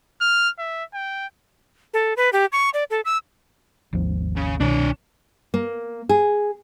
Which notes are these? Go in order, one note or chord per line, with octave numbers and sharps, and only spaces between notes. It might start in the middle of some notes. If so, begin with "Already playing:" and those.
F6
E5
G5
A4
B4
G4
C#6
D5
A4
E6
G#1 D#2 F3
C#3
C2 B2 D#3 D4 C#5
A#3
G#4